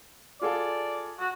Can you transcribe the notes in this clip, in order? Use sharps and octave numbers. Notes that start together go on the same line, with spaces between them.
F4 G#4 A4 D5
F#4